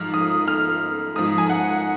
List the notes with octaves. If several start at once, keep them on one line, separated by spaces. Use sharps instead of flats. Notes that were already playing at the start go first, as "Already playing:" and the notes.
Already playing: G#2 F3 F6
D#6
F6
G#2 F3 D#6
G#5
F#5